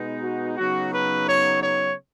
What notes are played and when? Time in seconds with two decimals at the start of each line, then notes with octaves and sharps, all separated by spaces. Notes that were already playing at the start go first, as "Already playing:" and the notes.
Already playing: B2 G#3 B3 D#4
0.23 F#4
0.57 C#3 F#3 B3 D#4 F#4
0.92 B4
1.26 C#5
1.60 C#5